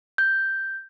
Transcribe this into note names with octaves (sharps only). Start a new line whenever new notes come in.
G6